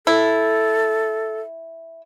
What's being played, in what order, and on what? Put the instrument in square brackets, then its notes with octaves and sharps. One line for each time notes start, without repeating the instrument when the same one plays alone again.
[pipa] E4 [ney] A4